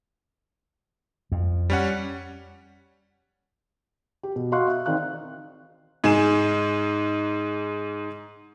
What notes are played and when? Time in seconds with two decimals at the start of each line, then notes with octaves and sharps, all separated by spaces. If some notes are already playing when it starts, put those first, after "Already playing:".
1.32 F2
1.70 G3 C#4 F#5
4.23 G4
4.36 B2
4.52 F#4 D#5 F5 C6 C#6 F#6
4.68 E5
4.86 D#3 C4 D5 F5 F#6
6.04 G#2 G#3 G#5 E7